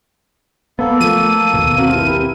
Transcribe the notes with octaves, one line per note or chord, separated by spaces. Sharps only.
A#3 B3 A4
F3 A3 D#7
D#2 B2
C4 F#4 A#4
E4 G4 B4